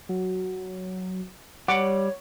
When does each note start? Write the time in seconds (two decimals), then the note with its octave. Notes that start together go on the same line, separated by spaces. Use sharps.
0.09 F#3
1.68 G3 C#5 F#5 D6